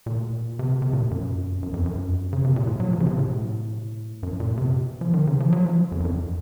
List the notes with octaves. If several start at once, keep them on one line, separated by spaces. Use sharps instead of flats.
A#2
C3
C3
A#2
F#2
F#2
F2
F#2
C#3
C3
A#2
A2
F#3
F3
C#3
C3
A2
F#2
A#2
C3
F3
D#3
C#3
F3
F#3
F3
F2
F#2
F2